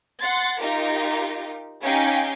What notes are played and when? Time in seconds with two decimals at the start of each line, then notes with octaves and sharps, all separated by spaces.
0.21 F#5 C6 A6
0.60 D#4 F4 G4 A#4
1.82 C#4 D#4 G4 F5 G5 G#5